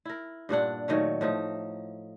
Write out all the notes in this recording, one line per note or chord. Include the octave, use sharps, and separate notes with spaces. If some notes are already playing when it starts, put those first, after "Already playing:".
E4 A#4
G2 A#2 D4 F#5
A#2 D#3 F#3 A3
A2 F3 D#4